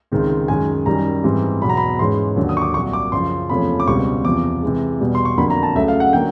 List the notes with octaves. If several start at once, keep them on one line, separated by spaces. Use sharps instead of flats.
C#2 C3 D#3 G#3 C4
F#2 D#3 G#3 G#5
F#2 D#3 G3 A#5
G#2 E3 G3 C4
E2 B2 F#3 B5
A#5
B5
G#2 E3 G#3 C#4 C6
D#2 D3 F#3
D#6
C#6
D6
C2 A#2 F#3 C#6
D6
F#2 C#3 F3 C6
E2 C3 F3 A3 C#4 B5
D6
C#2 B2 G3 C4 C#6
E2 C3 F3 D6
C3 E3 G#3
E2 B2 G3
C6
C#6
F2 D3 F#3 A#3 B5
A#5
A5
C#2 C#3 F#3 A3 E5
F5
F#5
D3 F#3 A#3 G5